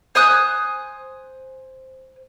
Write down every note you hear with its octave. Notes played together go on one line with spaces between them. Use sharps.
C5 G#5 D#6 F#6